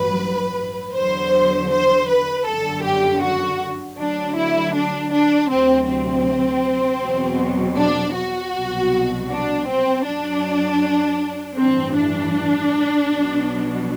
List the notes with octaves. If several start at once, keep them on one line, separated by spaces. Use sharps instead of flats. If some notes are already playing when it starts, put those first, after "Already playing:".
Already playing: A1 G2 F#3 B4
E2 D3 F#3 C5
C5
B4
G1 F#2 D3 A4
G4
F#4
D2 D3 F#3 D4
E4
D4
D4
D2 C3 F#3 C4
C4
E2 B2 F#3
D4
F#4
C2 B2 F#3
D4
C4
F#2 F#3 D4
A1 G2 E3 C4
D4
B1 B2 F#3